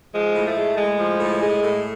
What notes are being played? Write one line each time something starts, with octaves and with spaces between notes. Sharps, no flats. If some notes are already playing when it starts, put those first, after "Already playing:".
F3 G#3
A2
A3
G#3
A2 G#3
F3
A2
G#3
A2